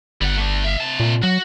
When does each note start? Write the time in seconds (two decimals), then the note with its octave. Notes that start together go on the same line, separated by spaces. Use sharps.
0.21 G1 G3 F#5
0.37 A3 D4
0.64 E5 F5
0.81 C3 A5
1.00 A#2
1.23 F#3 F#4